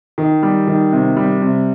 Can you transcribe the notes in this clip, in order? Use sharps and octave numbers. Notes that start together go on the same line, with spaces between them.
D#3
G3
D#3
C3
G3
C3